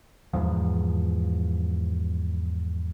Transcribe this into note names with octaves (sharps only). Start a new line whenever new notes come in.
E2 G#2 F3